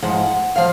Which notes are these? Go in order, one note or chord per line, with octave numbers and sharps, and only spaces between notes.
G#2 F3 G#3 F#5
F3 F5